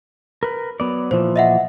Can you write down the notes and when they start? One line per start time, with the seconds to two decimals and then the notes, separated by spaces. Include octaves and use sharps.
0.43 A#4 B4
0.80 F#3 B3 D5
1.11 A#2 E3 F3 C5
1.36 D#5 E5 F#5